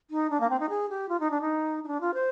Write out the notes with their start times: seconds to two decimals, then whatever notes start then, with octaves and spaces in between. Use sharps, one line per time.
0.10 D#4
0.30 D4
0.40 A#3
0.50 C4
0.59 D#4
0.69 G#4
0.89 G4
1.09 F4
1.20 D#4
1.31 D4
1.41 D#4
1.84 D#4
1.88 D4
2.01 F4
2.14 C5